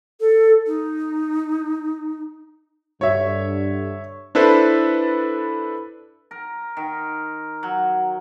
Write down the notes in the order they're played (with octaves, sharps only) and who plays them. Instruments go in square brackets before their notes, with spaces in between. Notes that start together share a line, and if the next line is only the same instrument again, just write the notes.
[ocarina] A4
D#4
[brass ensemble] G2 D3 [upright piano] C#5 E5
[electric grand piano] D4 E4 A4 B4 C5
[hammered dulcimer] A#4
D#3
F#3